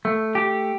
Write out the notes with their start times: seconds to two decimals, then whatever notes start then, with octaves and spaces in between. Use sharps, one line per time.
0.05 A3
0.35 G4